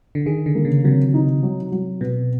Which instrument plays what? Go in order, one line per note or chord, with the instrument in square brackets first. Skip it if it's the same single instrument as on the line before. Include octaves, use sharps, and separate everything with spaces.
[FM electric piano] D3
[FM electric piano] D#3 [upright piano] G#4
[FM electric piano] D3
[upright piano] A#3
[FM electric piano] C#3
[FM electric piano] C3 [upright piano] F#3
[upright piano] D#4
F#3
F#3
[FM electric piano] B2 [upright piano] B3